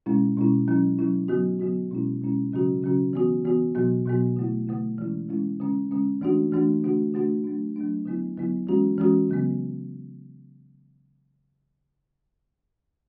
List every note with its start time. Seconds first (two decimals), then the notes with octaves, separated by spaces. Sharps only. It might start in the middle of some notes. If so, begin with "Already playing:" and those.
0.06 B2 G#3 C#4 E4
0.37 B2 G#3 C#4 E4
0.68 F#3 C#4 E4
0.99 F#3 C#4 E4
1.28 D3 F#3 B3 F#4
1.60 D3 F#3 B3 F#4
1.91 B2 G#3 C#4 E4
2.22 B2 G#3 C#4 E4
2.52 C#3 F#3 C#4 F#4
2.83 C#3 F#3 C#4 F#4
3.13 E3 B3 F#4
3.45 E3 B3 F#4
3.75 B2 F#3 B3 F#4
4.05 B2 F#3 B3 F#4
4.37 D3 A3 E4
4.68 D3 A3 E4
4.98 E3 G#3 C#4 E4
5.29 E3 G#3 C#4 E4
5.60 D3 G#3 C#4
5.91 D3 G#3 C#4
6.21 E3 A3 D4 F#4
6.52 E3 A3 D4 F#4
6.84 D3 A3 D4 F#4
7.14 D3 A3 D4 F#4
7.44 F#3 A3 D4
7.76 F#3 A3 D4
8.06 D3 F#3 B3 E4
8.37 D3 F#3 B3 E4
8.67 E3 G#3 C#4 F#4
8.98 E3 G#3 C#4 F#4
9.29 C#3 F#3 B3